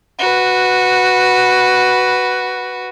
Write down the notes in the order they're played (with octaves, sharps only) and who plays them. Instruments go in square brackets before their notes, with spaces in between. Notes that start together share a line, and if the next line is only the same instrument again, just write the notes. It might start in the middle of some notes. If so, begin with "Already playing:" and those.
[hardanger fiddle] F#4 B4